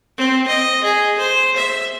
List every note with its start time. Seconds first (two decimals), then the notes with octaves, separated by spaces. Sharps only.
0.18 C4
0.48 D#5
0.84 G#4
1.19 C5
1.56 E5